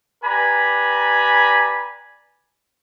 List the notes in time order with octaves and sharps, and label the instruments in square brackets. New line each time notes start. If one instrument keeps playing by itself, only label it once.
[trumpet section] G4 B4 D5 G#5 A#5 B5